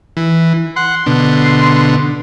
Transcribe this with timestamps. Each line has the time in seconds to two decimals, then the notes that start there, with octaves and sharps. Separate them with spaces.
0.17 E3
0.76 F#5 C6
1.06 B2 D3